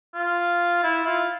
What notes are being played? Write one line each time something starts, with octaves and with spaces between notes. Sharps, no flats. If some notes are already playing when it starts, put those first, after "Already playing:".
F4
E4
F4